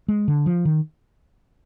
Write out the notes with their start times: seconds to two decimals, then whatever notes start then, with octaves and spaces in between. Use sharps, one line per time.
0.08 G#3
0.28 D3
0.46 F3
0.65 D#3